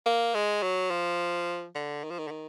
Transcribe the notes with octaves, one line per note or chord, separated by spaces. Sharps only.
A#3
G#3
F#3
F3
D3
D#3
F3
D#3
D3
D#3